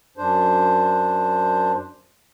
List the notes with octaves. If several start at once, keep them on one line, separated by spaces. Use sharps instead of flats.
F#2 D4 C5